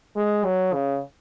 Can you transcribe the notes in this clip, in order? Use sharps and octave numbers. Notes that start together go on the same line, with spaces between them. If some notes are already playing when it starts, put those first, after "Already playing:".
G#3
F#3
C#3